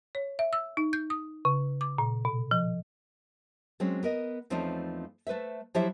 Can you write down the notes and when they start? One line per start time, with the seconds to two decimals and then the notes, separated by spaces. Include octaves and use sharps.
0.15 C#5
0.39 E5
0.53 E6
0.77 D#4
0.93 G6
1.10 D#6
1.45 C#3
1.81 D6
1.98 A#2
2.25 B2
2.51 F3
3.80 F#3 G#3 C4 C#4
4.03 B3 A#4 D#5
4.50 E2 F3 A3 C4 C#4 D#4
5.27 A3 B4 C5 E5
5.75 F3 F#3 E4 G4 C5 E5